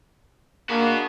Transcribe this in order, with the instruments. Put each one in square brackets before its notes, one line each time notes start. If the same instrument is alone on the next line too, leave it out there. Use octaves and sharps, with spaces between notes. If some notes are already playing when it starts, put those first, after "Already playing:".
[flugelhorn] A#3 [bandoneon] D4 G#4 F#5 [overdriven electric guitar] F#4 B5